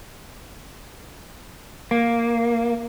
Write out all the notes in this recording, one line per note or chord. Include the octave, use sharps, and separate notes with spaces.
A#3